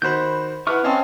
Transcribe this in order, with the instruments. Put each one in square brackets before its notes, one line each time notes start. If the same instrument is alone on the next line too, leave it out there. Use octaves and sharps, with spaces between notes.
[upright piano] D#3 F#4 C5 [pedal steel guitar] B5 G6
[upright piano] E4 B4 F#5 [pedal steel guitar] C#6 D6 F6
[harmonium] C4 [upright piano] C#4 D#5 A5 [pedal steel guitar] F5